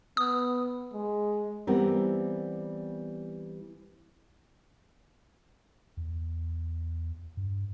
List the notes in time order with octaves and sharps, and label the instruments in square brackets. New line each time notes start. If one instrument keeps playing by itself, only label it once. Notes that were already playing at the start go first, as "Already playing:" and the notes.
[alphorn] B3 [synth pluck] D#6
[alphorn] G#3
[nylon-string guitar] E3 G3 B3 C4 A#4
[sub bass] E2
G2